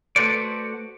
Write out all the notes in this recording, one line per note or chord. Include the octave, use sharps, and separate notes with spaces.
A3 F#4 A4 B4 C5 D5